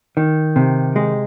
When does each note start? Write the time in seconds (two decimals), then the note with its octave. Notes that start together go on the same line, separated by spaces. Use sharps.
0.17 D#3
0.56 C3
0.96 G#3